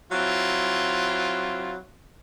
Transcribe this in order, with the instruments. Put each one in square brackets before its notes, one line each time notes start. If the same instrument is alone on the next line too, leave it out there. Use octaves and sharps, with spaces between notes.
[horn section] F#3 C4 E4 F4